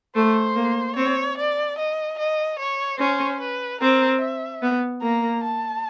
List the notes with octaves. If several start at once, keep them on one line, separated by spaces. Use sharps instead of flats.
A3 C5
A#3
C4 C#5
D5
D#5
D#5
C#5
C#4 C5
B4
C4 A#4
E5
B3
A#3 A#5
A5